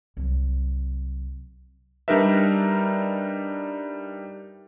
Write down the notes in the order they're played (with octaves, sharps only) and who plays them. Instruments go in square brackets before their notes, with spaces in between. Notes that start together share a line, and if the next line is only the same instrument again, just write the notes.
[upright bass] C2 F#3
[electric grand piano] G3 D4 D#4 A#4 B4 E5